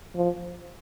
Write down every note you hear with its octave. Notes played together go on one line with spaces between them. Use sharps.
F3